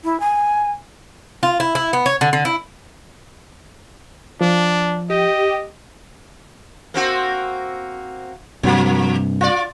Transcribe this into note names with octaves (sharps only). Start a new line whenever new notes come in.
E4
G#5
F4
E4
E4
B3
C#5
D3
D3
E4
F3 D4
G4 D#5
A#3 C4 F#4
G2 C3 F3 A#3
F4 D5